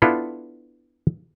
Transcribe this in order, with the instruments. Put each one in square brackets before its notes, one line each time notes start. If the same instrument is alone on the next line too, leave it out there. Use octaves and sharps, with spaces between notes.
[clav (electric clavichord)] B3 D4 E4 F4 A4